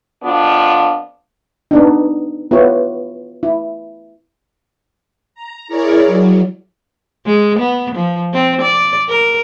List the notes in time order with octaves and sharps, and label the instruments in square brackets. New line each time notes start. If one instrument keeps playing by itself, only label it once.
[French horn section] F2 B3 D4 F4
[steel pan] B3 D4 D#4
B3 E4 F4 G4 B4 C#5
E4
[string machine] A#5
E4 G#4 A#4 C#5 D5
F#3
[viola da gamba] G#3
B3
F3
C4
D5
A#4